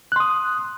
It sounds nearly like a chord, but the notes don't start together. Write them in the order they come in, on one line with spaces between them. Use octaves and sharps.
F#6 C6 D#6